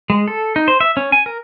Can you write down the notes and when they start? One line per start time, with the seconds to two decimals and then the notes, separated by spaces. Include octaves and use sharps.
0.10 G#3
0.28 A4
0.56 D#4
0.68 C5
0.81 E5
0.97 C#4
1.12 G#5
1.26 A#4